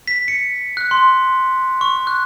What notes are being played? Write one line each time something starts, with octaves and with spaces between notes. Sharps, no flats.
B6
C#7
F#6
C6
C#6
F#6